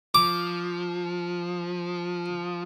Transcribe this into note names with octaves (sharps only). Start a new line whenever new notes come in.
F3 D6